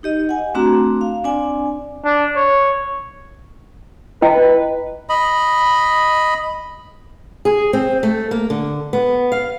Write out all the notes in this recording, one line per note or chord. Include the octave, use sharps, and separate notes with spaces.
D#4 G4 D#5
F#5 G#5
A3 C4 D4 F#4 A#5
F5
C4 D4 D5 G#5
D4
C#5
E4 B4 D#5 G5
D#5 B5
G#4
C4
A3
A#3
D3
B3
F5